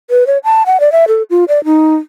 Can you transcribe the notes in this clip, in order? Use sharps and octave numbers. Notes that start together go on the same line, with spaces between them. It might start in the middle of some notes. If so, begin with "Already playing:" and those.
B4
C#5
A5
F#5
D5
E5
A4
F4
D5
D#4